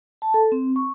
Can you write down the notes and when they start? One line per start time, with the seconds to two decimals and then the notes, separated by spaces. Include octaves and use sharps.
0.22 A5
0.34 A4
0.52 C4
0.76 C#6